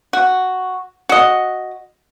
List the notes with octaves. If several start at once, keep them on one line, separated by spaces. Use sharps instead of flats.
F#4
F#4 D#5